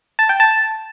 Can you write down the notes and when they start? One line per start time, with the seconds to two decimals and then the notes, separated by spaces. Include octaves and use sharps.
0.19 A5
0.29 G5
0.40 A5